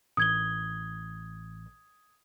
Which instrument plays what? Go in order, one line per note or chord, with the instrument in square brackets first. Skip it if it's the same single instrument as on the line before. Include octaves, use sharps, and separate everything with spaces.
[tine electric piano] A1 [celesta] D#6 G#6 G7